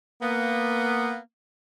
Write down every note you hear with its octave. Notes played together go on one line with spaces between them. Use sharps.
A#3 B3